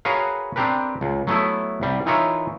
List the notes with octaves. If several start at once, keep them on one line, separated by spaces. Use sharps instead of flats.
F#4 G#4 A#4 B4 C#5 F5
C4 D4 G4 A#4 B4
C#2
F#3 A3 B3 E4
C2 G3
E3 D#4 F4 A#4 C#5 E5